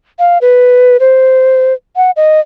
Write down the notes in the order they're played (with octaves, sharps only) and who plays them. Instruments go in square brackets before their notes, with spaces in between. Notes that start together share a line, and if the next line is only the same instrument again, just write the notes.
[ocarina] F5
B4
C5
F#5
D#5